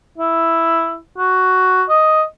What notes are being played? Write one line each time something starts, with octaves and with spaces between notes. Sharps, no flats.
E4
F#4
D#5